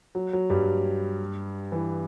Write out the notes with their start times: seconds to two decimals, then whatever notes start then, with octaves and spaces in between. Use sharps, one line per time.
0.15 F#3
0.33 F#3
0.50 G2 G3
1.72 E3